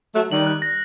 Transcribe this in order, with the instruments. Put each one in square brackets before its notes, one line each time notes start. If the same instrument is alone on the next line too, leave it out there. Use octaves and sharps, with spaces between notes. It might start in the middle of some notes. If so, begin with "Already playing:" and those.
[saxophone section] F#3 A3 [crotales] F#6
[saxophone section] D#3 G3 [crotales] F#7
[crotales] F#6
A#6